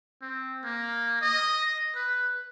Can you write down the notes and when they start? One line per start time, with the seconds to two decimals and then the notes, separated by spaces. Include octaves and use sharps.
0.22 C4
0.64 A#3
1.22 D#5
1.95 B4